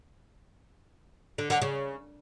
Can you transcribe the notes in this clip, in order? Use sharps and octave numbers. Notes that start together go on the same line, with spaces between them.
D3
D3
C#3